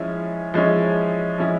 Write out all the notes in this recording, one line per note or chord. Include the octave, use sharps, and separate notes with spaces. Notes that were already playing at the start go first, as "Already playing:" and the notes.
Already playing: F3 G#3 C#4 E4
F3 G#3 C#4 E4
F3 G#3 C#4 E4